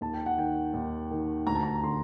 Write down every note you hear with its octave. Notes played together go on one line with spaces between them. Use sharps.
D#2 A5
G5
F#5
D#3 G5
D#2
D#3
D2 A#5
A5
A#5
D3 C6